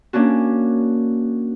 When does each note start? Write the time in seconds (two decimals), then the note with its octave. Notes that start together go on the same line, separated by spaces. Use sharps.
0.13 A#3 C#4 D4 F#4